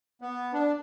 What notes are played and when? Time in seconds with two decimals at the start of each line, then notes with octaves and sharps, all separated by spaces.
0.21 B3
0.53 D4